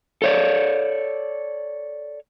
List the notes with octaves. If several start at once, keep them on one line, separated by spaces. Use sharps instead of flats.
A4 C#5 D5